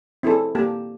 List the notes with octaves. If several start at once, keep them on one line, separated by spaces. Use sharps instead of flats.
C4 E4 G#4 A4
A#3 G4 A5